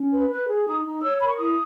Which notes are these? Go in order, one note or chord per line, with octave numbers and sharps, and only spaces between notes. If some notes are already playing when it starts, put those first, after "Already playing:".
Already playing: C#4
B4
B4 F#6
G#4
D#4 D#6
D#4
C#5 E6
A#4 B5
C#6
E4 D#6